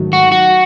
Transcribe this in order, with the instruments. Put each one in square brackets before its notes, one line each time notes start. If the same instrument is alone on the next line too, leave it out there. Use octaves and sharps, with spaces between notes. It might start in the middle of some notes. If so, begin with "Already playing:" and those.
Already playing: [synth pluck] G#2 D#3 F#3 A3
[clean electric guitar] F#4
F#4